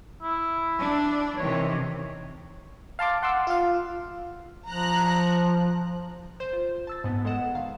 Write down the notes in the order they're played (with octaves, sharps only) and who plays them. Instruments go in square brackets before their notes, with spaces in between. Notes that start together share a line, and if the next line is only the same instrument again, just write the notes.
[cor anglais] E4
[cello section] D4
[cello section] C3 D#3 E3 [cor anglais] C#5
[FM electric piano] F5 A5 C6 D6
F#5 C6 D6 E6
F4 F5
[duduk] F3 [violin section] A#5 F#6
[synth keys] C5 G6 E7
F4
A5 E6 A6
G#2 B3
E2 G#3 A4 D#5 F#5 E7
D#3 F5